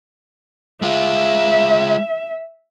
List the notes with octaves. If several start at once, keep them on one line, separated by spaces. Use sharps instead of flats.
G#3 F4 E5